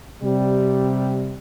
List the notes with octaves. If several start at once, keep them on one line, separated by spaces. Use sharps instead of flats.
C3 G3